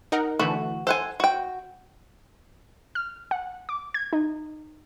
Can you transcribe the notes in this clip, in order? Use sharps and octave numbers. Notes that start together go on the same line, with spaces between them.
D#4 A#4 F#5
D3 E3 A3 F#4
A4 C5 F#5 G#5
F#4 G5
F6
F#5
D6
G#6
D#4